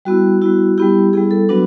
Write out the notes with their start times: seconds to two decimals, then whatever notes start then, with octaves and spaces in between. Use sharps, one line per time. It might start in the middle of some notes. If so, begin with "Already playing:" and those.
0.05 G3 B3 E4 F#4
0.42 G3 B3 E4 F#4
0.78 G3 B3 E4 G4
1.13 G3 B3 E4 G#4
1.31 A4
1.49 F#3 B3 D4 F#4 B4